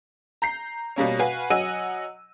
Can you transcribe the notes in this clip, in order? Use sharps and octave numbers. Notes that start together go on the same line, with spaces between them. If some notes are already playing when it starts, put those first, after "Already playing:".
A#5 G6 C7
B2 G3 A#3 C#4
F#4 B4 F5 G#5
F#3 D#5 F#5 G#5 E6 D#7